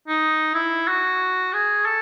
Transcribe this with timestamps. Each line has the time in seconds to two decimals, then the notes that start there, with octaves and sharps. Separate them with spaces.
0.09 D#4
0.55 E4
0.88 F#4
1.53 G#4
1.86 A4